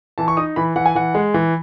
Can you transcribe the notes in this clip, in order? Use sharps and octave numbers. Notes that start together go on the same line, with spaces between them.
E3 A5
C#6
D#4 D#6
E3 B5
E3 F#5
G#5
E3 F#5
G#3
E3